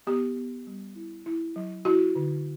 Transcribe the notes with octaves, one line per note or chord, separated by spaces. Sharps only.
B3 G4
B3
G3
E4
E4
F#3
E4 F#4
D3